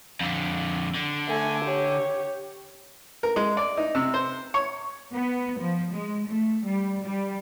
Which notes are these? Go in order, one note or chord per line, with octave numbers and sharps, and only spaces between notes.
F2 D3
D3
A3 G#5
G4 C#5
A#4
G#3
D5
D#4
C3
C5
C#5
B3
F3
G#3
A3
G3
G3